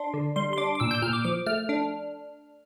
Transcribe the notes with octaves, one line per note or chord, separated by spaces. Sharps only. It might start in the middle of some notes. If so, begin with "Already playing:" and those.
Already playing: D4 C6
D3
G3 C6
C6
D4 D6
D6
A#2 E6
G6
A#2 F6
D6
F3 D6
A3 F6
D4